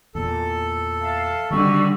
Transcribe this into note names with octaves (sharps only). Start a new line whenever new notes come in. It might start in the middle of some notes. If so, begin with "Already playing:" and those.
E2 A#2 A4
E5 F5 A5
D3 D#3 G3 C4 F#4 C#6 E6